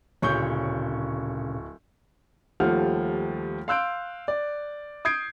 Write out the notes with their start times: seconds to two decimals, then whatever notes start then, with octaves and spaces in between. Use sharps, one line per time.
0.22 D1 A#2 C#3 C#5 C#6 G6
2.60 D#2 F3 G3 A3 F#5 F6
3.68 F5 C6 E6 F#6 G6 D7
4.28 D5
5.05 D#6 G6 G#6 C7 D7